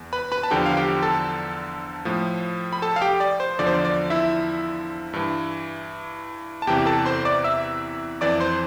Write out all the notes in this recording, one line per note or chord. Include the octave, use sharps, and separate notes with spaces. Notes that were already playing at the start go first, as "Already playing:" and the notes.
Already playing: E2
B4 B5
B4 B5
A5
E2 D3 F3 G4 G5
F5
G4 G5
A4 A5
A2 F3
B5
A4 A5
F5
G4 G5
D5
C5
E2 D3 F3 D5
C5
D5
D5
E4 E5
G2 E3
A5
E2 C3 E3 G4 G5
A4 A5
C5 C6
D5 D6
E5 E6
F2 E3 D5 D6
C5 C6